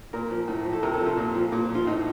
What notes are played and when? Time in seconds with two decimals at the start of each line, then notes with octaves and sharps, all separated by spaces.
0.13 A#2 A#4
0.31 F3
0.48 A2
0.65 F3
0.73 A4
0.83 C3 A#4
0.94 A4
1.00 F3
1.06 F4
1.17 A#2
1.35 F3
1.52 A#2
1.69 F3
1.75 F4
1.87 A2 D#4